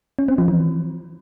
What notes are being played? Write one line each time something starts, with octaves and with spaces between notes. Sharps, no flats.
C#4
C4
F3
E3